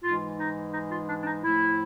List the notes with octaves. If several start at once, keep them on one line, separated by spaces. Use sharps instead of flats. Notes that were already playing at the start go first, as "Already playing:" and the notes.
G#2 E3 G#3 F4
D#4
D#4
F4
D4
D4
D#4
A2 F3 A3 E4